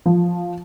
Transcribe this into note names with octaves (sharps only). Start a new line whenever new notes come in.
F3